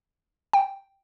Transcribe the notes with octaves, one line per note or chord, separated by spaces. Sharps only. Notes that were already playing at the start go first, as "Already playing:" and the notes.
G5